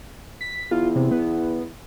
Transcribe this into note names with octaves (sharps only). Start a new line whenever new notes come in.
B6
E2 F4
C3
B3